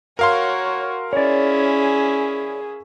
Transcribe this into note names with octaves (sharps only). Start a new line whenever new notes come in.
F#4 A#4 C#5 F5 C6
C#4 E4 G#4 C#5 D5